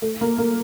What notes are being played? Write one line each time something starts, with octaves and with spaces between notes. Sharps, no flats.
A3
A#3
A#3